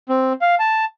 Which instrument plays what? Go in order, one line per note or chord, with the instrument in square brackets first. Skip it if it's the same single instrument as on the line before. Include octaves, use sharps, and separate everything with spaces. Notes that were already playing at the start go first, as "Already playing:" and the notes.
[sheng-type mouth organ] C4
F5
A5